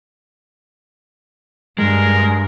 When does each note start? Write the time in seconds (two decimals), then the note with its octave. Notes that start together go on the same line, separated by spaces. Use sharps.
1.78 G2 G#3 A#4